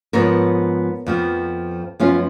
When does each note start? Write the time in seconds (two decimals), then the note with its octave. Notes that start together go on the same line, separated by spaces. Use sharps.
0.13 G#2 F3 B3 A#4 C#5
1.07 F2 F3 B3
2.00 F#2 F3 B3 C#4 F4